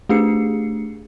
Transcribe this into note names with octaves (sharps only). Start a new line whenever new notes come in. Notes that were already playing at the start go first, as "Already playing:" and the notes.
A3 D4 G4 G#4 C7 C#7